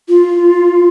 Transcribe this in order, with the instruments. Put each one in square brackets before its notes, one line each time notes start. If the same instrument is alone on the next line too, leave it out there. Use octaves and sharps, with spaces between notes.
[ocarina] F4